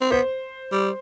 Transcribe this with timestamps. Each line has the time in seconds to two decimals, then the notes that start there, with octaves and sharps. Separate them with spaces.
0.01 C4
0.11 B3 C5
0.71 G3